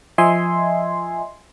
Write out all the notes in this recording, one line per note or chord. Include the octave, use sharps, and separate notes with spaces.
F3 D#5 E5 G#5 C6